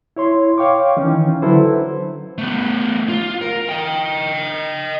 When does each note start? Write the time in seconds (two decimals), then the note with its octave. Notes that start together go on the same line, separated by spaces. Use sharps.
0.16 E4 C#5 C6
0.58 C#5 F5 G5 C#6 D6
0.97 D#3 E3 C#4 D#4
1.42 D3 F#3 E4 A4 B4 C5
2.38 A3 B3
3.09 F4
3.42 A#4
3.69 D#5 G5